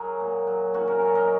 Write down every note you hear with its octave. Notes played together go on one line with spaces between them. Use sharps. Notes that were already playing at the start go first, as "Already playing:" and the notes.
Already playing: F#3 G#4 A#4 C#5
A#2
F#3
A#2 C#4 F#4
F#4 A#4
F#3 C#5
A#4 D#5